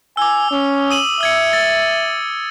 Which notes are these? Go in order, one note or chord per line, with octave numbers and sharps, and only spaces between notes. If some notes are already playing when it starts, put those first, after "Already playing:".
G#5 D6 E6
C#4
D#6 D#7 F#7
E5 E6 G#6 C#7
A6